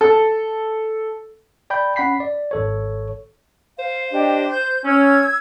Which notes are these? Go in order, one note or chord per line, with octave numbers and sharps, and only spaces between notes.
A4
D5 G5 B5 G6
C#4 F#5 B5 B6 C7
D5
G#1 A4 C#5
C5 F5
D4 G4 D#5
G6
C#4 E6 G#6